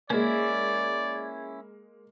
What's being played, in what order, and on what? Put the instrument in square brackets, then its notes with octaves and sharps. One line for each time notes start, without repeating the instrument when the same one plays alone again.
[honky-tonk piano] G#3 A#3 [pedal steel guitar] C#4 E4 [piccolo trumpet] D5